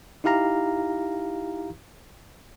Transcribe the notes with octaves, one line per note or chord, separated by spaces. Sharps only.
D#4 E4 G4 F5 A#5